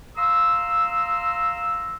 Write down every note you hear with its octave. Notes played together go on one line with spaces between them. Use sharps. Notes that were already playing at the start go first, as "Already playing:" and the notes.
F5 A#5 C6 D#6 E6